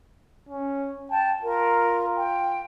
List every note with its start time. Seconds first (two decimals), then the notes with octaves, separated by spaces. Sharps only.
0.49 C#4
1.10 G5 A5
1.42 F4 A#4
2.16 G5